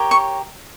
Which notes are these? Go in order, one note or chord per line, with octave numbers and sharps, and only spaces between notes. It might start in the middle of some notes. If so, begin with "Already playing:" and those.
Already playing: G4 A#4 C#5
C#6